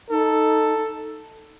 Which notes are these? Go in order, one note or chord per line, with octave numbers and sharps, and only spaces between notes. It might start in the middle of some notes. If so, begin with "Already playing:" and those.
D#4 A4